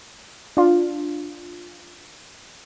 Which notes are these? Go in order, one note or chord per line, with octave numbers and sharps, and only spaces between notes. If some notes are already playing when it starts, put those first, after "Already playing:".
D4 F4